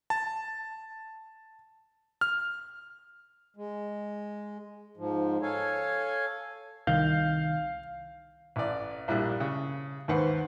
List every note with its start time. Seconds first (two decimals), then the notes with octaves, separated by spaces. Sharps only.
0.10 A5
2.21 F6
3.57 G#3
4.97 G#2 F3
5.42 A4 C#5 F5 G#5
6.87 C2 D#3 F5 G6
8.56 A1 D5
9.08 A#1 A2 G3 E5 F#6
9.40 C#3
10.08 D#2 G#2 B4 C5 F#5